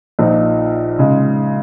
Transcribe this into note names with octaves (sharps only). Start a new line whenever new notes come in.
A#1 A#2 F3 D#4
C#3 G#3